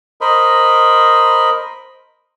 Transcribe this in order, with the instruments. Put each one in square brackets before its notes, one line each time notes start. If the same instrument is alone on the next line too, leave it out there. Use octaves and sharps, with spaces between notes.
[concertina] A#4 C5 D#5 B5